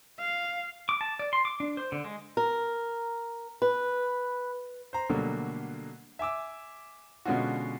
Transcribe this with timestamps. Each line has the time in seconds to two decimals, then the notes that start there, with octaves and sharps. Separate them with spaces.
0.19 F5
0.89 D6
1.01 A5
1.19 D5
1.33 C6
1.45 D6
1.60 D4
1.77 C5
1.92 D3
2.04 G#3
2.37 A#4
3.62 B4
4.93 C5 A#5
5.09 B2 D3 F#3 G3 A3 A#3
6.19 E5 G#5 D6 E6
7.25 B2 D3 G#3 C#4 F4 F#4